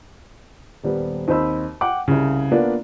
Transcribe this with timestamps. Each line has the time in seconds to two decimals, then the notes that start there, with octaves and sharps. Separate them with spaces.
0.84 D#1 G3 B3
1.28 D#2 C4 C5 D#5 B5 E6
1.81 F#5 G5 D6
2.08 C2 C#3
2.52 A#3 B3 D4 F4 A#4